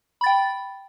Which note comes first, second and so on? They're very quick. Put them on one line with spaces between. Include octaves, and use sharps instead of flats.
B5 A6 G5